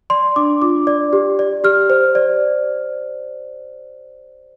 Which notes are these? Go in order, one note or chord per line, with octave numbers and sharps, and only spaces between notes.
D5 C6
D4 D6
F4 D6
D5
G4
D5
G4 F6
C5
D5